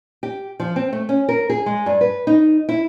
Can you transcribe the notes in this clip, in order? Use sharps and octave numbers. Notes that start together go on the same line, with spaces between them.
G4
F3
C4
A3
C#4
A#4
G#4
G#3
G2
B4
D#4
E4